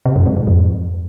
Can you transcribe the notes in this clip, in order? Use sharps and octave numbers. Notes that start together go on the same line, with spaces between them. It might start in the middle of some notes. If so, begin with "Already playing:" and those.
C3
F#2
G#2
G#2
F2